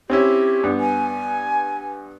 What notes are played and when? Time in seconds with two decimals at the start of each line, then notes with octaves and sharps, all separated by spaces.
0.10 C4 C#4 E4 G4
0.64 G2 B3
0.80 G#5